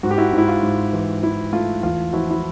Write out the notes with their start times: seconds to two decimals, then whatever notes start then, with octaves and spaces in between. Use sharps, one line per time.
0.03 G#2 F#4
0.11 G4
0.18 E4 F#4
0.33 G#2
0.38 E4
0.48 F4
0.63 G#2
0.93 E3
1.23 E3 E4
1.53 A3 F4
1.83 E2 F4
2.13 F3 E4 F#4
2.31 E4